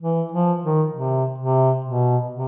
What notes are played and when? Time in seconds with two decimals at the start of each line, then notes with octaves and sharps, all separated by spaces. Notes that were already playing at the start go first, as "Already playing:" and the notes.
0.01 E3
0.32 F3
0.62 D#3
0.92 C3
1.38 C3
1.85 B2
2.31 C3